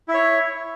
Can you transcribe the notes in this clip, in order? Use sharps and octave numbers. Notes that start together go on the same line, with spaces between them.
E4 C#5 E5